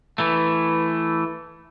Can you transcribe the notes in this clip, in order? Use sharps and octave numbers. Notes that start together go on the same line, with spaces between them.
E3 A3